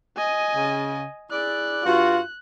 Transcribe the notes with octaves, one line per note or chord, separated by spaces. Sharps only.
D#5 G#5
C#3
E4 G#4 D5 F#6
G2 F4 F#4